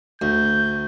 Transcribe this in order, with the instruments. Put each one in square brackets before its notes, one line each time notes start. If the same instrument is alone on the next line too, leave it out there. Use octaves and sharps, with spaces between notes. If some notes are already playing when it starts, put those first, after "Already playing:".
[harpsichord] D2 [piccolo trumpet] G6